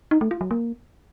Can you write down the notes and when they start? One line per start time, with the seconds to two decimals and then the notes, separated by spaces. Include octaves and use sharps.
0.11 D#4
0.21 A3
0.31 F4
0.41 F#3
0.51 A#3